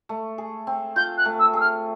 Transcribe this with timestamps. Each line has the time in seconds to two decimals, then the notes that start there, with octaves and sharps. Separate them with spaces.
0.09 A3
0.38 G#4
0.67 C4
0.96 F4 G6
1.18 F#6
1.25 A3
1.39 E6
1.53 G#4 E6
1.60 F6